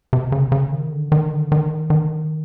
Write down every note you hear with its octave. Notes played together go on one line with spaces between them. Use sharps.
C3
C#3
C#3
D#3
D3
D#3
D3
D#3
D#3